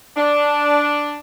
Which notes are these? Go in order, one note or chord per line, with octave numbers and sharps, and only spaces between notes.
D4